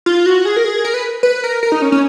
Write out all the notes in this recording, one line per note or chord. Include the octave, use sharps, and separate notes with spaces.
F4
F#4
G#4
A#4
G#4
A#4
B4
B4
A#4
A#4
D#4
C#4
C#4